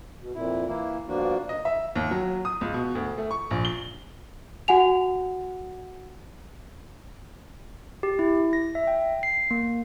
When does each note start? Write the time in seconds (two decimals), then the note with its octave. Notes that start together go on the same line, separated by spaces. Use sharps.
0.20 B2
0.35 F2 A#2 E4
0.67 E3 A#3 E4
1.08 G2 B2 F3 A#3 D4 F#4
1.49 D#5
1.65 E5
1.96 D#2
2.11 F#3
2.45 D#6
2.61 C#2
2.74 B2
2.95 D2
3.18 A3
3.31 C#6
3.51 A#1
3.65 G7
4.68 F#4 F#5 G#5 F7
8.03 G4
8.19 E4
8.53 A#6
8.75 E5
8.87 G5
9.23 C7
9.51 A#3